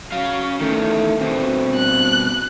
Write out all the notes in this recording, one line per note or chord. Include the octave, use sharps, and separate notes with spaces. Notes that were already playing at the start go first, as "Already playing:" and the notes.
F#3 C#4 F5
E2 D#3 A3
G2 B2 C4
F#6